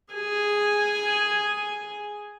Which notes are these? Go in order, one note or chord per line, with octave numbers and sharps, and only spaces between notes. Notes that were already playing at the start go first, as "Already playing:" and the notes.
G#4 G#5